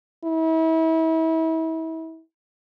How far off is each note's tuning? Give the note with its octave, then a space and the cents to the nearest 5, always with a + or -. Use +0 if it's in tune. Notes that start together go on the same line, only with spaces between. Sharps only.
E4 -35